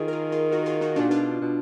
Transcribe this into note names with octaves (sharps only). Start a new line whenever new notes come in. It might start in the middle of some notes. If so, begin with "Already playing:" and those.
Already playing: D#3 F4 G#4
A#4
F4 G#4
F4 G#4
F#4 A#4
F4 G#4
D#4 F#4
A#2 D4 F4
B2 D4 F4
B2